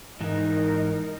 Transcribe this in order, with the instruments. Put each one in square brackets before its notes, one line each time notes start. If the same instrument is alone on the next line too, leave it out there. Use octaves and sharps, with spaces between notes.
[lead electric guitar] G#2 E3 [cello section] D#4 A#4